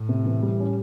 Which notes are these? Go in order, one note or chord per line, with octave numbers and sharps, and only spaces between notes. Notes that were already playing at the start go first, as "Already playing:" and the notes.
Already playing: A2
C3
E3
G3
C#4